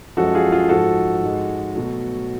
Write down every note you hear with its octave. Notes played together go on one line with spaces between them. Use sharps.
F#2 F3 G#3 F#4 A4
F4 G#4
F4 G#4
G#2 F3 G#3 F#4 A4
G#2 G#3
B2 F#3 A3